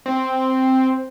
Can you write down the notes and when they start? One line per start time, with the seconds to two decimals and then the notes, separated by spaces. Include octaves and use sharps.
0.06 C4